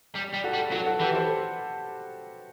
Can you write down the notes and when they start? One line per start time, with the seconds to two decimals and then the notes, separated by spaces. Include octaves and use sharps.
0.16 G3
0.34 G3
0.44 F#4 A4
0.54 G3
0.71 F#3 F#4 A4
0.86 F#4 A4
1.00 E3 G4 B4
1.14 A4 C5